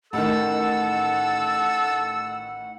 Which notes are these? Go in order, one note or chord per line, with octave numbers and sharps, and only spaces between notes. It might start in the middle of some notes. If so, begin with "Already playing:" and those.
A1 D#3 A4 F#5 E6